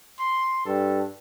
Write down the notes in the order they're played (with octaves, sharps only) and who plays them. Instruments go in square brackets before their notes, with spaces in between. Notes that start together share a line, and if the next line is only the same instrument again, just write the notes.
[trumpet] C6
[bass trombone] G2 [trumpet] A4